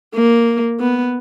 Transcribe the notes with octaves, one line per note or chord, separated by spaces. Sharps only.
A#3
B3